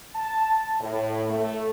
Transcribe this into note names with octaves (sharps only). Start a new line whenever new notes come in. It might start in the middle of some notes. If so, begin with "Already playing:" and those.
A5
A2
A3